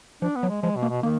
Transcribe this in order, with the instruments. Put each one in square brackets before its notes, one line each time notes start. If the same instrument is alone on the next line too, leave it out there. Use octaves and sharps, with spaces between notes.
[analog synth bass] F3 [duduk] D4
[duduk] B3
[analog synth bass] F#3
[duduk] G#3
[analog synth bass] F3 [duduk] G#3
[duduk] B2
[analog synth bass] A#3
[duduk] B2
[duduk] D#3 [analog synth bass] A#3